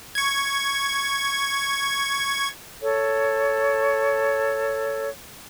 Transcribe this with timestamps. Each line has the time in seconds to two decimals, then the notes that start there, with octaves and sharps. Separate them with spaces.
0.15 C#6 G#6
2.81 A4 C#5